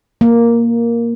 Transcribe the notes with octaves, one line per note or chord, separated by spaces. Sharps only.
A#3